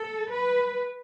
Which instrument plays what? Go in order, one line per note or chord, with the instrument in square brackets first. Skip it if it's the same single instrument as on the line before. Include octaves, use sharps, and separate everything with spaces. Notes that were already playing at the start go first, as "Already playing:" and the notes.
Already playing: [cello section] A4
B4